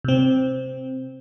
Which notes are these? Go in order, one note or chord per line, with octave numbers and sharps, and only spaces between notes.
C3 C4